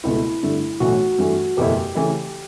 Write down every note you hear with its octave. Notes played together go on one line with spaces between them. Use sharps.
C#2 B2 A3 E4
G2 D3 A3
B1 A2 E3 A3 F#4
G2 E3 A3
F#1 E2 B2 A3 E4 G4
C#3 E3 A3 E4